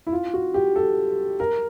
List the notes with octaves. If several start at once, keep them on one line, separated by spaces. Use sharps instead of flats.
E4
F4
F#4
G4
A4
A#4